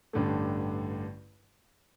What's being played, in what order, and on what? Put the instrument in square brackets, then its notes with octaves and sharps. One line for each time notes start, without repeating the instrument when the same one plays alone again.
[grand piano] A1 G2 D3 A3